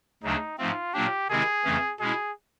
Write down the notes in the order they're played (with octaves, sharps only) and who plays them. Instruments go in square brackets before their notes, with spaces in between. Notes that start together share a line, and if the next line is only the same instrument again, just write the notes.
[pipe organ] D2 C#3 F#3 A3 D4 [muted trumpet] D#4
[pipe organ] G#2 F3 A3 C4 [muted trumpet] F4
[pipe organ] A#2 F#3 A#3 D4 [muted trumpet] G4
[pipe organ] C3 D#3 G#3 C4 E4 [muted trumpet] G#4
[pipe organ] F2 C#3 E3 A3 C#4
[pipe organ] B2 G#3 C#4 E4 [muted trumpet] G#4